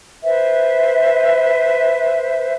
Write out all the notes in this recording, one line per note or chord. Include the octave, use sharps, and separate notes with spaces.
B4 C5 E5